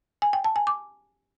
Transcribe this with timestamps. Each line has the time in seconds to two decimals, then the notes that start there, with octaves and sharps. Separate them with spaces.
0.22 G#5
0.33 G5
0.44 A5
0.56 G#5
0.67 D6